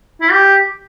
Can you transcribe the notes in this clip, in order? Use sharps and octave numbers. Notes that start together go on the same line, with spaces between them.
E4
G4